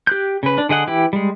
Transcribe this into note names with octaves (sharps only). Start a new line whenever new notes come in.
G4 F#6 G6
C#3 B4
D4
D3 G#4 D#5 F#5
E3 E4 G4
G3 G#3